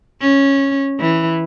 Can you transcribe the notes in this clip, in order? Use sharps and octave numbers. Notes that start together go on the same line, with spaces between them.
C#4
E3